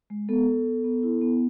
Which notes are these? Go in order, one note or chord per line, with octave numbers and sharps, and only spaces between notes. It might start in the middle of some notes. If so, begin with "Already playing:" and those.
G#3
B3 A4
B3
B3
B3
E4
B3